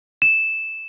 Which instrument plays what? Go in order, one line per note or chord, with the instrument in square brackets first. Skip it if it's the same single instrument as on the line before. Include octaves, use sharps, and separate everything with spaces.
[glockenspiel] E7